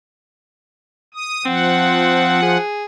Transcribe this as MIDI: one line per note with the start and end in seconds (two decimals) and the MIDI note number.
1.14 1.45 87
1.45 2.58 53
1.45 2.40 60
1.45 2.58 78
2.42 2.86 68